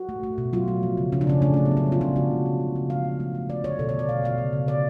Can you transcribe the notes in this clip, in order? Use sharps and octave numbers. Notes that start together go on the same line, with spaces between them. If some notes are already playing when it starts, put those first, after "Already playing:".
Already playing: F#4
A3
A3
B2
F#3 F4
A3
F3
C#3
C#3 C#4
D4
C#3 C#4
A3 D4
A3 C#4
B3
F#3
C#4
F#3
F4
C#3 D4
G#3 F#4
C#3
C#3
C#3
C#3
F3 F5
C#3
A3
A3
A3 D5
D3 C#5
B2 A4
C#5
A3
D5
B2 F5
B2 F5
C#3
C#3
C#3 D5